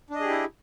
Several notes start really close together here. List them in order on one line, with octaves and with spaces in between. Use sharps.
D4 D#5 G#4 G4 E4